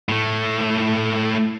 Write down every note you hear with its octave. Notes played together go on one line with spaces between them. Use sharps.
A2 A3